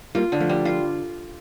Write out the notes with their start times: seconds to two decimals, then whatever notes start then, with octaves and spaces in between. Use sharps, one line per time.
0.15 G3 A#3 F4
0.32 D3
0.41 F3 A3
0.49 G3
0.65 F4